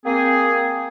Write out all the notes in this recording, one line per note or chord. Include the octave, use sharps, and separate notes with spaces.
A#3 C4 G#4